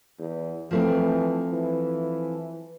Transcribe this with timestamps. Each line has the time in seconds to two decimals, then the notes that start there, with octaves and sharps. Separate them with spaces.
0.18 E2
0.71 E3 F3 A3 C4
1.51 E3